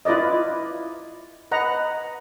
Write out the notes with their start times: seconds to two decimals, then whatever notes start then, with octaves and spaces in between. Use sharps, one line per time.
0.05 E4 F4 B4 D5 D#5
1.52 B4 D#5 F#5 A#5